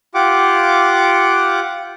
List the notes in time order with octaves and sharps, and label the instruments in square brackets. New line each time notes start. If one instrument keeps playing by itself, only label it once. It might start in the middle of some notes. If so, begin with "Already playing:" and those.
[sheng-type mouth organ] F4 G4 F#5 D6